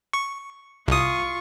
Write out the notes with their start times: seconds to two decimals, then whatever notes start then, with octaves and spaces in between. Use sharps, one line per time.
0.13 C#6
0.88 C2 F4 C#6 D#6